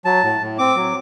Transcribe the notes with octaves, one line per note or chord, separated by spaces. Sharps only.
F#3 A5
A2
A2
C4 D6
F#3